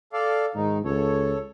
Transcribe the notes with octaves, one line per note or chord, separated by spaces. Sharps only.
A4 D5 F5
G#2 D#3 D#4
C#2 A4 C#5